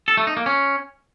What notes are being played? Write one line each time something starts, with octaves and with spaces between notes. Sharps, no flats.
A4
A3
D#4
A#3
C#4